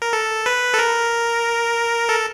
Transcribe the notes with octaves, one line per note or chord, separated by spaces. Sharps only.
A#4
A4
B4
A4
A#4
A4